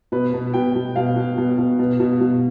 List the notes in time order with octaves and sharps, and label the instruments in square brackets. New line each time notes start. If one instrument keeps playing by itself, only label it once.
[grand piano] B2 B4
B2
B2 G5
B2
B2 F5
B2
B2
B2
B2
B2
B2